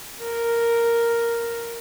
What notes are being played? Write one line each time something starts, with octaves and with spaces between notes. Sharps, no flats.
A#4